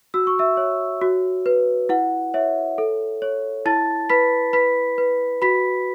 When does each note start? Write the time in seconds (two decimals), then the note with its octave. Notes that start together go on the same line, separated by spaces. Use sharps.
0.14 F#4 E6
0.27 C#6
0.39 E5 E6
0.57 C#5
1.01 F#4
1.46 B4
1.89 E4 F#5
2.34 C#5 E5
2.78 A4
3.22 C#5
3.66 E4 A5 A6
4.09 B4 B5 B6
4.53 B4 B5 B6
4.98 B4
5.42 F#4 B5 B6